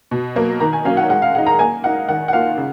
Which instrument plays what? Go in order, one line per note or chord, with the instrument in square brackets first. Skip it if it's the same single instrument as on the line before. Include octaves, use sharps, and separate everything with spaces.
[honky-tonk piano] B2
F#3 A#3
[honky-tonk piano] D#3 [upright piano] A#5
[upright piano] G#5
[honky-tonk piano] F#3 A#3 C#4 [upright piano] F5
[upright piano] F#5
[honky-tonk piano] G#3 [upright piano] F#5
[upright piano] F5
[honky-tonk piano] G#4 [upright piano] F#5
[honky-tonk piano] D#4
[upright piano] A#5
[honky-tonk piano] A#3 [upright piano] G#5
[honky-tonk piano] D#4 A#4 F5 [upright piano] F#5
[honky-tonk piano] D#3 [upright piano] F#5
[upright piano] F#5
[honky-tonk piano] A#3 F4 [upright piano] F5
[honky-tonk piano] C#3